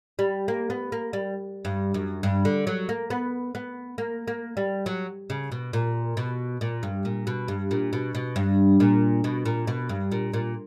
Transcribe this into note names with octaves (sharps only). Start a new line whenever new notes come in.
G3
A#3
B3
A#3
G3
G2
F#2
G2
D3
F#3
A#3
B3
B3
A#3
A#3
G3
F#3
C#3
B2
A#2
B2
A#2
G2
A#2
B2
G2
A#2
B2
B2
G2
A#2
B2
A#2
B2
G2
A#2
A#2